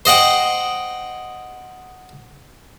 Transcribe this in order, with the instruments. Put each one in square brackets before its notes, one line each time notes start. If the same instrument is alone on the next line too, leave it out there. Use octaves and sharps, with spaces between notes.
[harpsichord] C5 D#5 F#5 G5